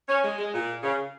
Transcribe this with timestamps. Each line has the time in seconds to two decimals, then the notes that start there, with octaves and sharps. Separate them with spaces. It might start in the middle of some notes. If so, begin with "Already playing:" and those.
0.09 C#4
0.23 G#3
0.38 G#3
0.53 A#2
0.83 C#3